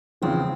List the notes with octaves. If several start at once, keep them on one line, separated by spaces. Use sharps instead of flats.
E2 C#3 F3 C4